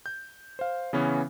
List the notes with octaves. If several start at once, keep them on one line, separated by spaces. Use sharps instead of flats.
G6
C5 F5
C#3 E3 B3 C#4